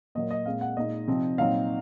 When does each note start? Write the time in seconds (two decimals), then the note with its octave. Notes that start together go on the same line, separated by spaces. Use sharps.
0.15 A#2 F#3 A#3 D#5
0.31 D#5
0.46 A#2 G#3 C4 F5
0.61 F#5
0.77 A#2 G#3 D#4 D#5
1.07 C3 F3 C4 D#4
1.38 A#2 F#3 C4 D#4 F5